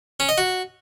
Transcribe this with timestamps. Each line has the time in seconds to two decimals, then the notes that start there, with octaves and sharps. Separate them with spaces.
0.20 C#4
0.29 D#5
0.38 F#4